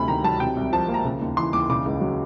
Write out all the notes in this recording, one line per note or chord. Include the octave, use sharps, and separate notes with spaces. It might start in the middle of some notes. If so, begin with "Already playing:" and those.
Already playing: D2 C3 B5
D#3 A#5
F#3 A5
C3 G5
C2
F3 A5
A#3
A#5
C#3
D#2
E3 C6
D#2 D6
C#3 D6
C#2
F#3